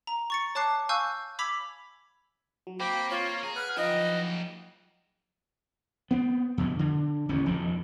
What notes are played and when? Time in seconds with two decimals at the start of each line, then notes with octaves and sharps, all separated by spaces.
0.07 A#5
0.30 C#6 A6 C#7
0.55 C#5 A5 D6 F#6 C7
0.89 F5 G#5 C#6 E6 F#6 G6
1.39 B5 D6 E6 G#6 B6 F7
2.67 F#3
2.80 A#3 C4 G5 B5 D6
3.10 A#3 F4 C#5
3.43 G#4 A#5
3.56 B4 F#5 F6
3.77 F3 F#3 D#4 F4 D#5 G5
6.11 B3 C4
6.58 F2 B2
6.79 D3
7.29 D#1 A1 E2 C#4
7.46 E1 F2 D#3